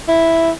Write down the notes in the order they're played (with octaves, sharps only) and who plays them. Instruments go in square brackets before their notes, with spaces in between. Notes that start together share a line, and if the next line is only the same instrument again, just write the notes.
[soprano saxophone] E4